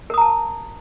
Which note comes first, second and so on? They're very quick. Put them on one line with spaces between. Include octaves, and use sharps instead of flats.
A#4 D#6 A#5 A5